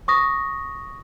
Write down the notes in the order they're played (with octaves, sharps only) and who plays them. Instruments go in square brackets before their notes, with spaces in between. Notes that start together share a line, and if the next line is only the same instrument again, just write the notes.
[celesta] C#6 D#6 A#6